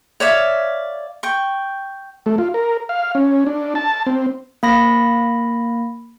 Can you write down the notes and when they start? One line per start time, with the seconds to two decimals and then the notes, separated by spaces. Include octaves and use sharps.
0.20 C#5 D5 E5 F5
1.23 G5 C#6
2.26 A3
2.38 F4
2.54 A#4
2.89 F5
3.15 C#4
3.47 D4
3.75 A5
4.06 C4
4.63 A#3 B5 A#6